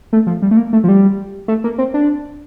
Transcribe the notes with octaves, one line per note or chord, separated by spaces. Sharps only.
A3
F3
G3
A3
A#3
A3
F3
G3
A3
A#3
C4
D4